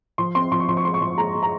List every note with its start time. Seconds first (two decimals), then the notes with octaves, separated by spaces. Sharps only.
0.18 F3 C6
0.35 C4 C6
0.52 F3 C6
0.60 C#6
0.68 F3 C6
0.77 C#6
0.85 G#3 C6
0.94 C#6
1.01 F3 C6
1.18 G#3 A#5
1.35 G#3
1.43 A#5